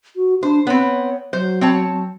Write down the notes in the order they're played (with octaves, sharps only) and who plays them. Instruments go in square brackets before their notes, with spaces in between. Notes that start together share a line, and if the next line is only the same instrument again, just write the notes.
[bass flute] F#4
[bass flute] D4 [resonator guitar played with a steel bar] C5
[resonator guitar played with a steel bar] B3 C4 [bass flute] C#5
[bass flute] F#3 [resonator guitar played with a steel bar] C5
[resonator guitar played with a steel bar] C4 C#5 A5